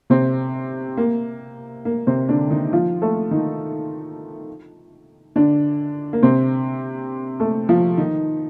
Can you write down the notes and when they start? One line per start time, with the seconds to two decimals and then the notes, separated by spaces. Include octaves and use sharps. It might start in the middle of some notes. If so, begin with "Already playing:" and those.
0.10 C3 C4
0.97 A#3
1.85 A#3
2.07 C3 C4
2.29 D3 D4
2.50 D#3 D#4
2.73 F3 F4
3.02 A3 A4
3.31 D#3 D#4
5.36 D3 D4
6.13 A#3
6.23 C3 C4
7.40 A3 A4
7.69 F3 F4
7.98 D#3 D#4